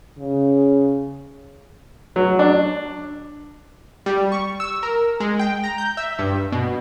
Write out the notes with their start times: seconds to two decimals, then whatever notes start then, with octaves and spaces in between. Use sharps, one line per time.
0.18 C#3
2.16 F#3
2.39 D4
4.06 G3
4.32 C#6
4.60 E6
4.83 A#4
5.20 G#3
5.39 G5
5.64 A#5
5.78 G6
5.97 E5
6.19 G2
6.52 B2